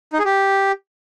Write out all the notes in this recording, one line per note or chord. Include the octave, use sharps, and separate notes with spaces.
D#4
G#4
G4